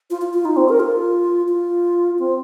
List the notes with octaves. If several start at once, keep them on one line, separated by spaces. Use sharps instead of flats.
F4
F4
F4
D#4
C4
A#4
F4
F4
C4